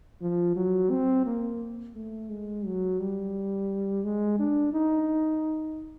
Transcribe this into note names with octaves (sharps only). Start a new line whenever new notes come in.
F3
F#3
C4
A#3
A3
G#3
F#3
G3
G#3
D4
D#4